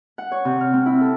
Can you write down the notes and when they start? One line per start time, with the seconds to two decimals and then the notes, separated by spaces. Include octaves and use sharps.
0.18 F#5
0.32 C#5
0.45 C3
0.61 F6
0.73 C4
0.86 E4
1.01 A4